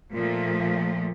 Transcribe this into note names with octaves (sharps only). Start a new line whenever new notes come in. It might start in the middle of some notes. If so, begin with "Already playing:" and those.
A#2 F3 A3